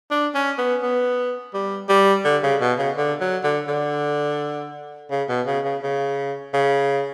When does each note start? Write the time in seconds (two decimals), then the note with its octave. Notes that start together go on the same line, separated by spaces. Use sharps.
0.11 D4
0.35 C#4
0.58 B3
0.83 B3
1.54 G3
1.89 G3
2.25 D3
2.43 C#3
2.61 B2
2.79 C#3
2.97 D3
3.21 F#3
3.44 D3
3.68 D3
5.11 C#3
5.29 B2
5.47 C#3
5.64 C#3
5.83 C#3
6.54 C#3